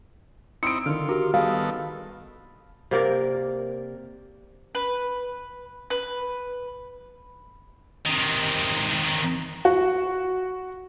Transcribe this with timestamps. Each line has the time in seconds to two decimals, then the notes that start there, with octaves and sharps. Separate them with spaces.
0.63 C4 D#4 E4 C#7 D7
0.86 D3 D#3 F4
1.09 F#4 G4 A#4
1.34 D#3 G3 B3 G#4 A4 F5
2.91 C3 A#3 A#4 D5
4.75 B4
5.90 B4
8.05 C3 D#3
9.65 F#4